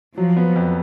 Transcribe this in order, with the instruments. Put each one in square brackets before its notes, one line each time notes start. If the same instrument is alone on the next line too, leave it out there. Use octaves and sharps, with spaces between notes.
[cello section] F3 [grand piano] F#3
[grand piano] B3
F2